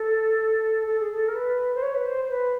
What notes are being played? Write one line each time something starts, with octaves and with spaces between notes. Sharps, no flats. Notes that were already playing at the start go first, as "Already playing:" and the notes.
Already playing: A4
A4
G#4
A4
A#4
B4
C5
C#5
B4
C5
C5
B4